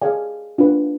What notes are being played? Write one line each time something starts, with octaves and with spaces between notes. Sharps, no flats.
G#4 D5 F5 G#5
D4 F4 B4